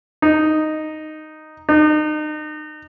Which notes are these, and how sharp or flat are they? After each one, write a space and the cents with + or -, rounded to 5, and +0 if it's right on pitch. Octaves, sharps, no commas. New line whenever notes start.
D#4 -5
D#4 -35